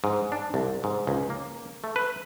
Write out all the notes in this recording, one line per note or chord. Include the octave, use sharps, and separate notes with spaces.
G#2
D4
C2
G#2
C#2
A#3
A3
B4